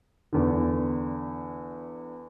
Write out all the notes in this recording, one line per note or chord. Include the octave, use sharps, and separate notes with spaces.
E2 D3